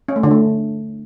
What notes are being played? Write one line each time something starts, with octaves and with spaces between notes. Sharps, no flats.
C#4
A3
D3
A3